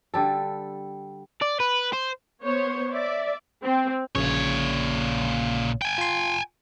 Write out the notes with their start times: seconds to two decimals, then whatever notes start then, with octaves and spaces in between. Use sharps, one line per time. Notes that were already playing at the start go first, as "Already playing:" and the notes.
0.14 D3 G3 A4
1.42 D5
1.60 B4
1.93 C5
2.43 B3 C5 C#5
2.93 D5 E5
3.63 C4
4.15 A#1 A#2 C#3 C#5
5.82 G5 G#5
5.98 F4 C6